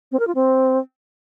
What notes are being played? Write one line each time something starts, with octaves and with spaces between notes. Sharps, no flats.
C4
A#4
F4
C4